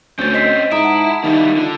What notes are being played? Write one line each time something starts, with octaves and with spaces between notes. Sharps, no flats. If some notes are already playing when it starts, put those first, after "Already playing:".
D2 C4 C#4 G6 A6
D#5 B6 C7
G#2 E4 A#5 D#6 D7
F#5 A5
D#3 G3 A#3 E4
D3 D4 F4